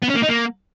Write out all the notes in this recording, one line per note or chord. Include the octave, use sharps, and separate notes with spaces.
B3
C#4
A#3
D#4
A#3